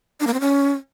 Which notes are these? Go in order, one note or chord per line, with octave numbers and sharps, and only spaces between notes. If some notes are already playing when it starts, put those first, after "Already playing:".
D4
A#3
C4
C#4